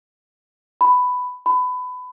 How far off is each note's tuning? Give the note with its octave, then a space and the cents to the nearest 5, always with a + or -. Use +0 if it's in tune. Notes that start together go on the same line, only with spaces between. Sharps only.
B5 +10
B5 +25